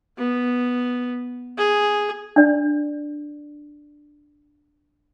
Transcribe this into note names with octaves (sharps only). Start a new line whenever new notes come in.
B3
G#4
D4 D5